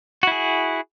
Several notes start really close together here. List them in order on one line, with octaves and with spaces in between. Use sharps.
F#4 E4 G#4